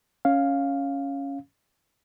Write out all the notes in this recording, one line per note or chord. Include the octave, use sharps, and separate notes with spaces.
C#4 F5